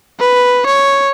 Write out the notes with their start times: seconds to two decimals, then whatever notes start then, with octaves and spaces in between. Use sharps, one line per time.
0.19 B4
0.66 C#5